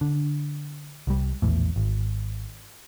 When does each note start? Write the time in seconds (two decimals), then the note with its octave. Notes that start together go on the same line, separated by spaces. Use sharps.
0.01 D3
1.07 C2 G3
1.42 A#1 E2 A2
1.76 G#1